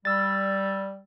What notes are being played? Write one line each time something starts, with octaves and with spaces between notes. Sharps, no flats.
G3 E6 A6